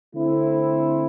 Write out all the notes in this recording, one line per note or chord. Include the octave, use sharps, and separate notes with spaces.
D3 A3 C4 E4